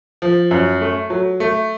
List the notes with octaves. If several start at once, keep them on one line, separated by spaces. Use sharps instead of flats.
F3
F#2
A3
F#3
A3